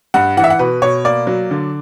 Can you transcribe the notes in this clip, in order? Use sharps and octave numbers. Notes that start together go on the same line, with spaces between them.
G2 F#5
E3 F#5
E5
F#5
B2 B4
B2 C#5
A#3 D5
F#3
D3